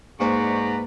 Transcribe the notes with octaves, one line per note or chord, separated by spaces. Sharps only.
G#2 A#3 B4 C5 D5 A#5 C#6